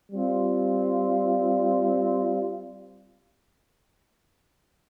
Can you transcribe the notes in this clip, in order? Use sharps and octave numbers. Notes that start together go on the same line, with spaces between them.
G3 C4 F4